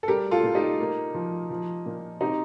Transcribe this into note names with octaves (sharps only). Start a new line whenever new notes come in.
A4
G3 G4 A#4
F4 A4
A#2
D#4 G4
A#3
F3
F3
A#2
C4 D#4 G4